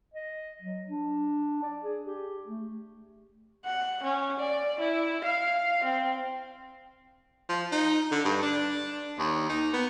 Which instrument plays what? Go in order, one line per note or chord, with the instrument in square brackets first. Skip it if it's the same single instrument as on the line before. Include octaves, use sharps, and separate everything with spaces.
[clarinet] D#5
F#3
D4
D5
G#4
G4
A3
[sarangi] F#5
C#4
D5
E4
F5
C4
[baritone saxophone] F3
D#4
D3
G2
D4
D#2
D#4
B3